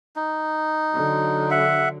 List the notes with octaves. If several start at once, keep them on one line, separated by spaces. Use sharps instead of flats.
D#4
D3 F#3
E5 F#5